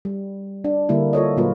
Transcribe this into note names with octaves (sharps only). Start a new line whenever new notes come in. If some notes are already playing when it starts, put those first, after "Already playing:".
G3
D4
D3 G3 A#3 E4
F4 A4 C#5 D#5
A#2 F#3 A#3 F4 A#4 B4